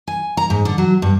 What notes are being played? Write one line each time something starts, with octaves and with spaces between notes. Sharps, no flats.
G#5
A#5
G#2
D3
F#3
G2